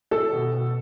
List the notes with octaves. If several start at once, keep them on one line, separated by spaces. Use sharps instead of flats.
A3 A4
B2
B2